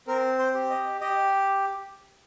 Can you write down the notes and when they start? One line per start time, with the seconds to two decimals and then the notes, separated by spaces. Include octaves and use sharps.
0.07 C4 A#4
0.39 C5
0.54 G4
0.70 D#5
1.01 G4 D#5